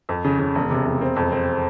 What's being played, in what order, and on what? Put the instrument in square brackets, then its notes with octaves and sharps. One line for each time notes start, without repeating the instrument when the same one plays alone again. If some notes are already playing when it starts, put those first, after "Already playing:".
[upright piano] F2
C#3
C#3
E1
C3
E1
C4
F2
C4